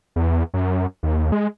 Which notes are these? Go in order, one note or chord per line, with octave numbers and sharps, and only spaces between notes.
E2
F#2
D#2
G#3